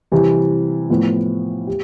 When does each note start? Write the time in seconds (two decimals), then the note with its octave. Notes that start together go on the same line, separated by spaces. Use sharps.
0.11 C3 E3 G3
0.90 A2 F3 B3
1.67 G4